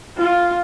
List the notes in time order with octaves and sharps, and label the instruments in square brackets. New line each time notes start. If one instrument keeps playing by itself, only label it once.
[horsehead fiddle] F4